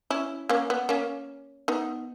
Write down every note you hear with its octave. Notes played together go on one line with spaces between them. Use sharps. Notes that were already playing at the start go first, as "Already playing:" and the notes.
C#4 E4
A#3 C#4
B3
A#3 C#4
B3 D#4